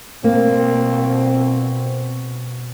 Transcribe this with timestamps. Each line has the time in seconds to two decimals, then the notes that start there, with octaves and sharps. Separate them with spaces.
0.24 B2 A#3 C4